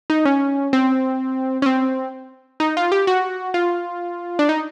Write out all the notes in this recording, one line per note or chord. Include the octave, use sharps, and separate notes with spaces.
D#4
C#4
C4
C#4
C4
D#4
F4
G4
F#4
F4
D4
D#4